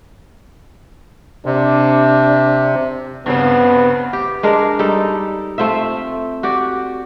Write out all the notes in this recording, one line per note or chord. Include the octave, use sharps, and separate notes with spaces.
C3 D4
G2 C#3 B3 C4
G4
G#3 D4 A#4
G3 D#4 A4
A3 C4 F4 E5
F#4 G4 D5